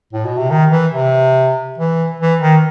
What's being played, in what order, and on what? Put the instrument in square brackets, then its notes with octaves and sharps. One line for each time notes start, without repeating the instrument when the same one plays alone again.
[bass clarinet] A2
B2
C3
D#3
E3
C3
E3
E3
D#3